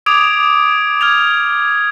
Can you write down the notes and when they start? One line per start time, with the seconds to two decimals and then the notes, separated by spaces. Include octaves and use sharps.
0.06 D6 D#6 G#6 D7 F7
1.01 F6 G#6 F7